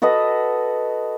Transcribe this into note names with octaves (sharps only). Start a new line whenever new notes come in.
F#4 A4 B4 D#5